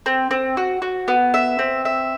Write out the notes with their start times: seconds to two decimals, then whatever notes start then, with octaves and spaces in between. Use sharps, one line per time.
0.06 C4
0.31 C4
0.57 F#4
0.82 F#4
1.08 B3
1.34 E5
1.59 C4
1.85 E5